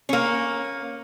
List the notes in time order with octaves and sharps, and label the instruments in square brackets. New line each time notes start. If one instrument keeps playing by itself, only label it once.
[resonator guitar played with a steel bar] A#3 C#4